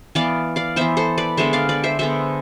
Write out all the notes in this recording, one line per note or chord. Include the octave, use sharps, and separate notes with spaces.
E3 B3 D5 F5
D5 F5
E3 B3 C5 E5
A4 C5
B4 D5
D3 G#3 B3 C5 E5
D5 F5
B4 D5
C5 E5
D3 G#3 B3 C5 E5